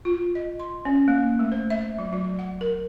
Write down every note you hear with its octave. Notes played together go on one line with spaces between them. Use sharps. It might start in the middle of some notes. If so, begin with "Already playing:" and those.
F4
D#5
C6
C#4
A#3
A3
C5
E5
F#3
F#3
F#5
A#4